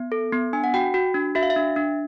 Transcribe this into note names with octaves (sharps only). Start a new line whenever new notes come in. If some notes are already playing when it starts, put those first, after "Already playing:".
Already playing: B3
A4
B3
D4 G#5
F#5
F#4 G5
F#4
D4
F#4 E5
F5
E5
D4
D4